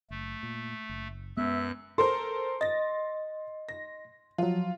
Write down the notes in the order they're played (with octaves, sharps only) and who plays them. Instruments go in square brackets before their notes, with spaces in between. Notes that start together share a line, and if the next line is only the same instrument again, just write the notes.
[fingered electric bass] F#1 [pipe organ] A3
[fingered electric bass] A#2
F#1
[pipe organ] F#2 F#6 [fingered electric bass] G#3 [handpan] B3 [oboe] E5
[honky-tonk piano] A4 A#4 C5 [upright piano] C6
[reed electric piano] D#5 [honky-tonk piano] A6 A#6
[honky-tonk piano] A#6
[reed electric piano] F3 F#3 [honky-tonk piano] F4